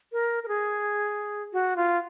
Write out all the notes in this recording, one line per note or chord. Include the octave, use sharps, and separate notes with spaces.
A#4
A#4
G#4
F#4
F4